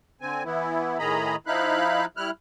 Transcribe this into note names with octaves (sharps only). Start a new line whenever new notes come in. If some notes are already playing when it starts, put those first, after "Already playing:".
D3 C4 G#5
E3 B3 E4
A2 D#3 G#4 D#5 A#5 B5
F3 D#4 E4 F5 B5 F#6
G3 E4 F6 F#6